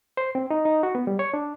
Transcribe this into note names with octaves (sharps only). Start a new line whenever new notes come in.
C5
C4
D#4
D#4
F#4
B3
G3
C#5
D4